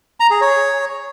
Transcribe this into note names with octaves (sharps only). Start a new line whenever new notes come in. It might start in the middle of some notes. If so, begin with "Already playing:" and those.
A#5
G#4
C#5